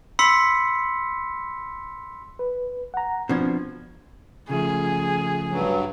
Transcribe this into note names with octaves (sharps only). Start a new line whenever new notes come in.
B5 C6 E6 B6 C#7
B4
F#5 A#5
B2 F3 C4 D4 G#6
C#3 F3 A3 G#4
G2 F#3